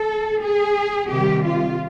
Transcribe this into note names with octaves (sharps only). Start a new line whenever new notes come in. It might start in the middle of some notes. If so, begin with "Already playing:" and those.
Already playing: A4
G#4
C3 D#3 G3 G4
F4